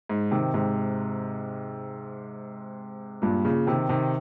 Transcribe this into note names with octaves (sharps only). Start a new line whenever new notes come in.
G#2
C3 D#3
G#2 C3
G2 A#2
A#2 C#3
C3 D#3
C3 D#3